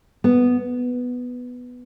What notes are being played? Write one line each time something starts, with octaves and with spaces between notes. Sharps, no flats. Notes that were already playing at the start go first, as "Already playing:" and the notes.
B3